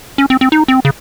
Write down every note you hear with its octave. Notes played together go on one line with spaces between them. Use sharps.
C#4
C4
C4
D#4
C4
C#3